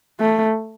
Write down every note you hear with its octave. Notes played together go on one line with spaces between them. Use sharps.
A3